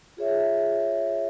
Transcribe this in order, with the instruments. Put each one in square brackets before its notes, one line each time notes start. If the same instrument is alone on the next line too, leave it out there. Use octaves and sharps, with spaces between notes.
[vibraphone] F4 G#4 C#5 E5